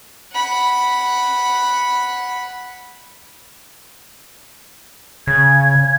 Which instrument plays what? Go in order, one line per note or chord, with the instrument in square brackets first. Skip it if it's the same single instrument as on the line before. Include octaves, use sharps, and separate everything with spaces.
[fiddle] F#5 B5
[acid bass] C#3 [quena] G#6